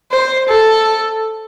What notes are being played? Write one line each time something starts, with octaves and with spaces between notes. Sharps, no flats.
C5
A4